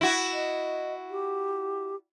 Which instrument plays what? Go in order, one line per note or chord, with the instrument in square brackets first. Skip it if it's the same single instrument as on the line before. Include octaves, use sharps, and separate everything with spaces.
[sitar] E4 F#4
[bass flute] D#5
G4